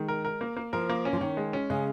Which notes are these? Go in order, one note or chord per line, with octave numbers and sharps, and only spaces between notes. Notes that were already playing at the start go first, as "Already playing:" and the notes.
Already playing: D#3 G#3
A#4
A#4
A#3
A#3
F3 A#4
A#3
C#4
F3
D#3 C#5
G#3
C#4
C#3 G#3